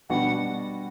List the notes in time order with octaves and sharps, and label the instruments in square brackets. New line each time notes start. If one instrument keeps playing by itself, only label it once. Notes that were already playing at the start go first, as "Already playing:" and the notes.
[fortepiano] B2 G3 D4 F#4 [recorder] F#5